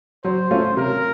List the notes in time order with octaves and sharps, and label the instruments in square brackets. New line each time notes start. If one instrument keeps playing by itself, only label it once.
[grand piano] F#3 [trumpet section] C5
[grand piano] A3 C#4 F4
[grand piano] C3 [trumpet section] A#4